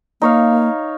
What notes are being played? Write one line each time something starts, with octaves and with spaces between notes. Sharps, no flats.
A#3 D#4 C#5 F5